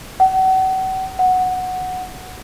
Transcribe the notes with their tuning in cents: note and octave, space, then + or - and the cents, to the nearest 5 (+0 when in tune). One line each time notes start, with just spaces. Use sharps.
F#5 +35
F#5 -5